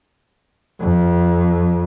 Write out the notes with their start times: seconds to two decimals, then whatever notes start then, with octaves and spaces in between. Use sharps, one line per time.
0.80 F2